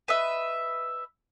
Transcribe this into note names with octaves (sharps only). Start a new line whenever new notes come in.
B4 D#5 E5